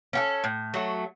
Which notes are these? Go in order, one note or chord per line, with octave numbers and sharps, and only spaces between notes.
C#4 F#4 A4
A2
F#3 A3